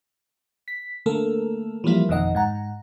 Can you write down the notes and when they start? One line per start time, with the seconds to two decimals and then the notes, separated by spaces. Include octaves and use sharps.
0.68 B6
1.06 D3 A3 A#3 A4 A#4
1.84 E3 F3 G3 A#3 E4
2.08 G#1 F2 B2 D#3 D#5 F#5
2.35 G#2 F#5 A#5